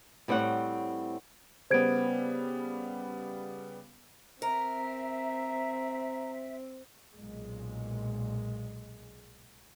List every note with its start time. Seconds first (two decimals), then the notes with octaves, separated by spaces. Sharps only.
0.28 A2 G3 C4 C#5 F#5
1.71 C#3 G3 B3 C5 G#6 D7
4.42 C4 A#4 E5 A#5
7.15 B1 A#2 G#3